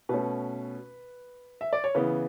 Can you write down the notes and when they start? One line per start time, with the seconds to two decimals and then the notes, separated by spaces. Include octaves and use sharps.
0.09 B2 A3 C#4 B4
1.61 E5
1.73 D5
1.84 C#5
1.95 C#3 E3 B3 B4